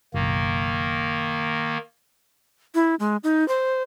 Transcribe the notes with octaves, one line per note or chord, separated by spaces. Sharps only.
F#1 B1 D#3 A#3
E4
G#3
D#4
C5